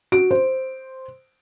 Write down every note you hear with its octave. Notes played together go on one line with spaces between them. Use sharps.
F#4 D7
C5